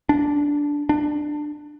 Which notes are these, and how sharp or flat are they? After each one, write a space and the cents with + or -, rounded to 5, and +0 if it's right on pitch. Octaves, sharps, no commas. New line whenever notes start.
D4 -10
D4 +20